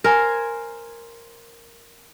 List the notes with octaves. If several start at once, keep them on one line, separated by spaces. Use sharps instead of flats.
A#4 C5 G#5